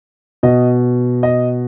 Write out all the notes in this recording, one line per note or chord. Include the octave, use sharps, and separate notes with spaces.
B2 D#5
D#5